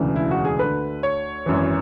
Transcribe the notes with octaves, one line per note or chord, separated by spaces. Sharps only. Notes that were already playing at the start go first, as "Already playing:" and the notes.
Already playing: E1 D2 C#3 E3
E4
F#4
G#4
D2 D3 B4
C#5
G#1 F#2 E3